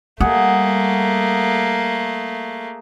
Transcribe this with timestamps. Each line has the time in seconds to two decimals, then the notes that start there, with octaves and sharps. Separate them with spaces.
0.20 G3 A3 A#3 G#4 F#5